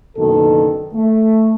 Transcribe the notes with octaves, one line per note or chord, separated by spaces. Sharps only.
F#1 B2 D3 D#3 A4
A3